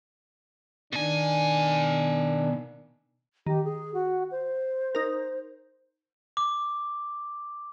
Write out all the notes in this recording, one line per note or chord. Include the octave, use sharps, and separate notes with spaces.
B2 D#3 D4 G#5
D#3 G4
G#4
F#4
C5
D#4 A#4
D6